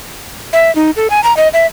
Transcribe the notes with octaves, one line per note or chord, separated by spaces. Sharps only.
E5
D#4
A4
G#5
A#5
D#5
E5